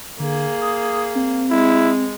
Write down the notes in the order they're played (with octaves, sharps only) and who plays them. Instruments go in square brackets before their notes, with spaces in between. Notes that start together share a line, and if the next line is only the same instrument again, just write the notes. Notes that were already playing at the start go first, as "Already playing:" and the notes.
[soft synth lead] D3 [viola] A#3 G#4
[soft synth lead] D#6
C4
[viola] G#3 [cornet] E4